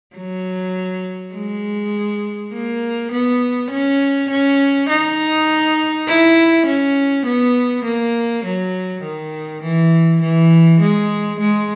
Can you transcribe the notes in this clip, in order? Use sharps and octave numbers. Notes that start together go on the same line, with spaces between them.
F#3
G#3
A#3
B3
C#4
C#4
D#4
E4
C#4
B3
A#3
F#3
D#3
E3
E3
G#3
G#3